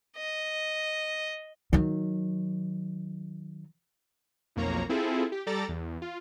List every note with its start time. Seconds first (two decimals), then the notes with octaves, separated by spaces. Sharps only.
0.17 D#5
1.73 D#3 F#3
4.56 B1 F2 A#3 C#5 A#5
4.89 C4 E4 F4 G#4 A4
5.32 G4
5.46 G3 A4 D5 A#5 A6
5.68 E2
6.02 F4